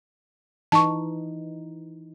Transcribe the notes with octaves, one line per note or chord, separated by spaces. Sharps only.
E3 D#4 A5 C#6